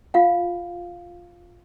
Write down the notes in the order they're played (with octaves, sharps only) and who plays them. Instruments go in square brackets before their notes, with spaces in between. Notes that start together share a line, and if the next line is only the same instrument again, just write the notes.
[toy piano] F4 F5 F#5